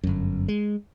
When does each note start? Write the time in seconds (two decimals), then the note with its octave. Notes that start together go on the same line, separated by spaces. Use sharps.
0.04 G1 F#2
0.48 G#3